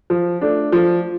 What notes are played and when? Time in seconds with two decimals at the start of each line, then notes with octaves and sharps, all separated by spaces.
0.10 F3
0.41 A3 D4
0.72 F3